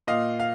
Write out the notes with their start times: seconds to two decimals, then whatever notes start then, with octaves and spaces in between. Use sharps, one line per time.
0.07 A#2 D#5 F5
0.40 F5